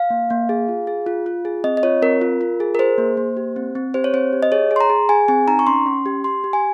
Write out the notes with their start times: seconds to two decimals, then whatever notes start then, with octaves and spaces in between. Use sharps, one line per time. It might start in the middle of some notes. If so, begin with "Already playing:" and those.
Already playing: F5
0.10 A#3
0.30 A#3
0.49 G#4
0.69 F4
0.87 G#4
1.06 F4
1.26 F4
1.45 G#4
1.64 C4 D#5
1.77 D#5
1.83 F4 C#5
2.02 C4 A#4
2.21 F4
2.41 F4
2.60 G#4
2.75 A#4
2.79 G#4 C5
2.98 A#3
3.17 A#3
3.37 G4
3.56 C4
3.75 C4
3.94 G4 C5
4.04 C#5
4.13 C4 C5
4.33 G4
4.43 D#5
4.52 G#4 C#5
4.71 G#4
4.76 C6
4.81 A#5
4.90 G#4
5.09 G#4 G#5
5.28 C4 G#5
5.48 D#4 A#5
5.59 C#6
5.67 C#4 C6
5.86 C#4
6.06 G4
6.24 G4 C6
6.44 G4
6.53 G#5